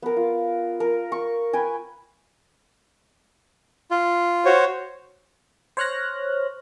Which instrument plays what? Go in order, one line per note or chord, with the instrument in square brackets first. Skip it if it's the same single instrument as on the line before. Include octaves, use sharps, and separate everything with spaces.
[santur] B3 A#4
F4
A#4
C#6
B4 G5 G#5
[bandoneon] F4
[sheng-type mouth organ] F#4 C5 C#5
[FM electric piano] C5 C#5 F6 F#6 A#6